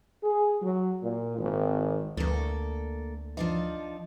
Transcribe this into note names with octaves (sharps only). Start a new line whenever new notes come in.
G#4
F#3
A#2
G#1
D2 A#3 A4
F3 D4 D#4